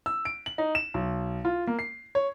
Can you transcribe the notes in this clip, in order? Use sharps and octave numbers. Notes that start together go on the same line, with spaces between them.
E6
D7
F#7
D#4
E7
B1
F4
A#3
C7
C#5